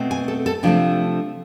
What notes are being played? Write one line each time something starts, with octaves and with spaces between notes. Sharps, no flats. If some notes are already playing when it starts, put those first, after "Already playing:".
Already playing: B2 A3 C4
G#5
A4
A4
C3 F3 A3 C4 D4